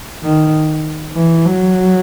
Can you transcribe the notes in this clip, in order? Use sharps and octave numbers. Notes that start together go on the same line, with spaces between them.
D#3
E3
F#3